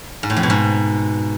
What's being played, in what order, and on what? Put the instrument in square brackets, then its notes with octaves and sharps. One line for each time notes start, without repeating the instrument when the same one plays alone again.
[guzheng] G#2
A2
F2
B2
G#2